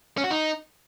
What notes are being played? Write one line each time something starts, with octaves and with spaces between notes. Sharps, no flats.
C#4
F#4
D#4